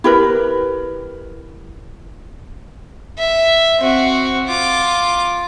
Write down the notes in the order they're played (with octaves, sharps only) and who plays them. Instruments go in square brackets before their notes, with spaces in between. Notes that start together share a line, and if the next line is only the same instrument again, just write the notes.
[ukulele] E4 G4 A#4 B4
[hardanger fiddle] E5
C4 F#4
F4 D6